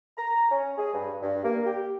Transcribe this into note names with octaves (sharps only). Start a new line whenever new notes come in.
A#5
C#4
G#4
G2
G2
A#3
G4